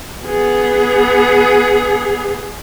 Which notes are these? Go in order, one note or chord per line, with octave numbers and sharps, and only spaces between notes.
B3 G#4